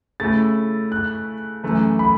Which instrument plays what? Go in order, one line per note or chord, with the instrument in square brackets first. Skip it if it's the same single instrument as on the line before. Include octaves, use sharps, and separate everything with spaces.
[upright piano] C#3 A3 E4 [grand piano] A6
[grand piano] F#6
[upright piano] F#2 E3 A3
[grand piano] B5